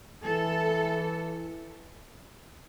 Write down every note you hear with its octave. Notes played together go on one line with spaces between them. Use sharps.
E3 A4